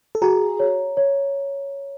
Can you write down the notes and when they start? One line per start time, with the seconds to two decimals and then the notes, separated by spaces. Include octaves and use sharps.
0.15 A4
0.22 F#4 G#4 A#5
0.60 C#5
0.97 C#5